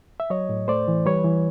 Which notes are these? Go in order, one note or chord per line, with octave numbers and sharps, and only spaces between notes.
E5
F#3 C#5 D#5
A2
A3 C5 D5
E3
G3 B4 C#5
E3